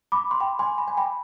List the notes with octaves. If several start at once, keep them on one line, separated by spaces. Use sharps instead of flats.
B5 D6
C6
G5 B5
G#5 C6
B5
G#5
G5 B5